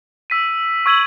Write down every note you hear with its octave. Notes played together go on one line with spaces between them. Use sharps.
E6 B6 D#7
C#6 E6 G#6 D#7 F#7